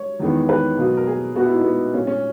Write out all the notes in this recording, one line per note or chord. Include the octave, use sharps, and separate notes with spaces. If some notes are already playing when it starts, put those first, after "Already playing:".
Already playing: C#5
E2 D#3 G#3 B3
B4
B2 F#3 A#3
A#4
G#4
A#2 G#3 B3 F#4
E4
D#4
B3
A#2 A#3 C#4
C#4